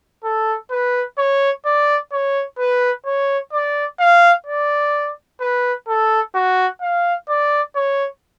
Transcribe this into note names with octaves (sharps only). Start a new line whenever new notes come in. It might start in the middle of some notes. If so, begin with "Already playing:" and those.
A4
B4
C#5
D5
C#5
B4
C#5
D5
F5
D5
B4
A4
F#4
F5
D5
C#5